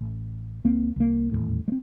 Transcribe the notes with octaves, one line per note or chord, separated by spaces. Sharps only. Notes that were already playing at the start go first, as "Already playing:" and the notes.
A1
C#2 A#3 C4
C2 A#3
D#1 A#1 E2 A2
G#3 C4